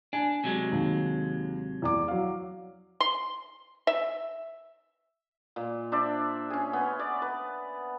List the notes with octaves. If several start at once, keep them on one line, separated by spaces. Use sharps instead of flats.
D4 G#5
C3 F#3 G#3
D#2
E2 D5 D6
F#3 F5
C6
E5
A#2
D4 C5 D5 E5
C#4 G#4
B3
D5
B4